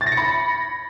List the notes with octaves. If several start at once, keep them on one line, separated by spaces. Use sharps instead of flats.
A6
A#6
C#7
B5